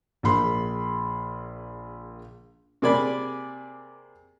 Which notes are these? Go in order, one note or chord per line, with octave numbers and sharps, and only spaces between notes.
A#1 A#3 G#4 B5 C6
C3 A#3 G#4 D5 G#5 B5